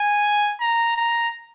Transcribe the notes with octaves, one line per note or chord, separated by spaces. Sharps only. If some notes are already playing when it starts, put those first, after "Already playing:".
Already playing: G#5
A#5
A#5